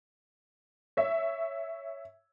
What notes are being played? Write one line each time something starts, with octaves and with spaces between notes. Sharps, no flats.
C#5 E5